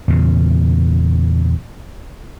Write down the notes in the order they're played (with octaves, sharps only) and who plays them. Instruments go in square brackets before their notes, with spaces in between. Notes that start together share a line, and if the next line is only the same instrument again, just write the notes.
[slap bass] E2 A#2 C#3